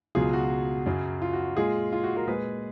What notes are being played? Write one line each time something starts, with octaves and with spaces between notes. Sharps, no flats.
C#2 B2 F#3 F4 G#4
F#4
F#2 C#3 F#3
F4
F#4
A#2 G#3 F4 G#4
F4
F#4
F#4 A#4
A#2 G#3 G#4 B4